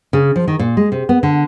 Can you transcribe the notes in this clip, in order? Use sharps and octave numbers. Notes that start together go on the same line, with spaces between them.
C#3
F3
D#3
A#2
G#3
C3
B3
D3